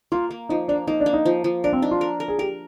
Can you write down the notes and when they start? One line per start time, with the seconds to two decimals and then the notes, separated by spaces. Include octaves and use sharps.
0.12 A#3 F4
0.31 A#3
0.49 F3 D#4
0.68 A#3 D4
0.87 A#3 D#4
1.00 D4
1.06 A#3
1.13 D#4
1.26 F3
1.44 F3
1.64 D4 A#4
1.73 C4
1.82 D4 D#4
1.91 F4
2.01 A#4
2.20 A#4
2.28 G#4
2.39 G4 A#4